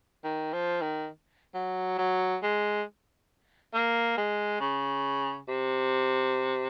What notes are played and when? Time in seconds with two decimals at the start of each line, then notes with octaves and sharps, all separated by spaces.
0.24 D#3
0.53 F3
0.81 D#3
1.54 F#3
1.98 F#3
2.43 G#3
3.74 A#3
4.17 G#3
4.60 C#3
5.48 C3